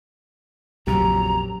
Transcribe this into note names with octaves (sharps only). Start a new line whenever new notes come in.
A#1 F2 C#3 F#3 G4 A#5